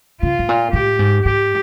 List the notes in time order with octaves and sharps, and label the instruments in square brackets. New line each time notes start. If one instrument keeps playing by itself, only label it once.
[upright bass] C#3 [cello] F4
[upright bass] A2
A#2
[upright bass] A2 [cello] G4
[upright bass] G#2
[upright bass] G#2 [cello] G4